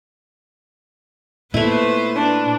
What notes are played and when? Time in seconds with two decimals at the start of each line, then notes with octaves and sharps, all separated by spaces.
1.54 A#2 A3 B3 E4 B4 C5
2.15 D4